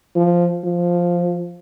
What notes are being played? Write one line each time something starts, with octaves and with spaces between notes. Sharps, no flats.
F3
F3